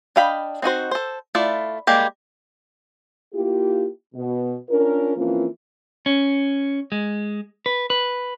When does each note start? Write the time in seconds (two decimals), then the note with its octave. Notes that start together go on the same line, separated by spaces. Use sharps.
0.16 D4 D#5 F5 G5 B5
0.62 C4 D#4 F#4 C5
0.91 A4 C5
1.35 A3 E4 F4 D5
1.87 G3 G#3 A#3 G4
3.33 A#3 E4 F4 G4
4.15 B2
4.69 C#4 D4 F4 A#4
5.16 E3 F3 A#3 C4 C#4 F4
6.06 C#4
6.92 G#3
7.66 B4
7.90 B4